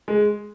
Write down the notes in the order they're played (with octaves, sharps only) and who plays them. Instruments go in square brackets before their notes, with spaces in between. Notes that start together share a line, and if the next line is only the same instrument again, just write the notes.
[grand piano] G#3